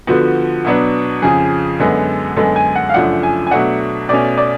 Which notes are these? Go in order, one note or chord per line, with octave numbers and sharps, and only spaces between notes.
D3 F3 B3 F#4
B2 F#3 B3 D4
F2 C#3 F3 G#4
F#2 D3 G#3 B3
F#2 D3 G#3 B3 A4
G#5
F#5
F5
F#2 C#3 F3 A3 D4 F#5
G#5
G#5
B2 F#3 A3 D4 F#5
B2 A3 C#4 D5
D5